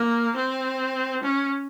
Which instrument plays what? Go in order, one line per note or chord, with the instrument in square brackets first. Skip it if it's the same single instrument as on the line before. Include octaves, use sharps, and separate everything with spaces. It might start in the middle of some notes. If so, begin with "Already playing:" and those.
Already playing: [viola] A#3
C4
C#4